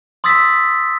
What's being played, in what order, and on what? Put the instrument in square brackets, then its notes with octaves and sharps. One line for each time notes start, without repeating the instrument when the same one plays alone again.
[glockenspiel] C6 D#6 E6 A6 B6